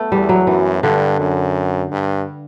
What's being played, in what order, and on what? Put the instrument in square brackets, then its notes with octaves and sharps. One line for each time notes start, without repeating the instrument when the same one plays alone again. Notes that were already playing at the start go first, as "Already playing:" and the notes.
Already playing: [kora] A3 B3
[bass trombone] E2 [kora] G3
[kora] F#3
[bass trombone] F#2 [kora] E3
[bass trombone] G2 [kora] D3
[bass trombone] F#2
G2